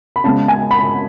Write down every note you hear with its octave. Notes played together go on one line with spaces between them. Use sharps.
B5
C#3 G#3 B3 A5
G#5
B5